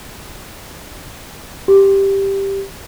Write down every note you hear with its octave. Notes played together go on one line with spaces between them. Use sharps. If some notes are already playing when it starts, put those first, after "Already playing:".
G4